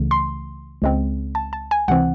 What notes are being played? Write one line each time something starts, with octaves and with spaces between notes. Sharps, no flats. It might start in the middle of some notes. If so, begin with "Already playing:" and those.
Already playing: C#2 C#3 E3 A3
C6
C#2 C#3 G#3 C4
A5
A5
G#5
C#2 C3 E3 C4 F#5